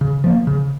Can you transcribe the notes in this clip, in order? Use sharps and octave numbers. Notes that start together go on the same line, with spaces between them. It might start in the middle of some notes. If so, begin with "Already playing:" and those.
C#3
F3 A#3
C#3